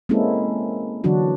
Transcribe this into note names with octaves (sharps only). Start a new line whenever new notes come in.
G#3 A#3 C4 C#4 E4 A4
D3 E3 F#3 D4 F#4